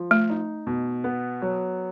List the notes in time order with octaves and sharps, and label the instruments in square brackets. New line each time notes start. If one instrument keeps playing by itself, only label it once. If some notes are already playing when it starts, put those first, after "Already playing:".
Already playing: [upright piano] F3
[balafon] A3
[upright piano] D#4
B2
B3
F#3